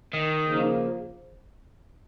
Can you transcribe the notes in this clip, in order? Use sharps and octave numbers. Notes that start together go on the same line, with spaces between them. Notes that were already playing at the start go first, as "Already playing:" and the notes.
D#3
C#3 F3 A#3